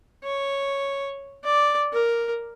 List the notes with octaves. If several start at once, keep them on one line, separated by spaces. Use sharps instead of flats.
C#5
D5
A#4